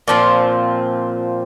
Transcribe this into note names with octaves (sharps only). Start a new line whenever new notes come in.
A#2 F3 C4